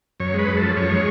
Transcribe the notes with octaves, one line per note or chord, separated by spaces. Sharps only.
F#2 C#5
G#3 B4
F#2
A4
F3
F#2 C#5
G#3